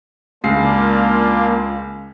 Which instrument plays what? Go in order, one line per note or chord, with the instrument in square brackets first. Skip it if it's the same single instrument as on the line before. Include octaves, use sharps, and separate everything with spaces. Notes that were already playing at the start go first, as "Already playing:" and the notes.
[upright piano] C#2 C7 [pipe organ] A#3 D4 F4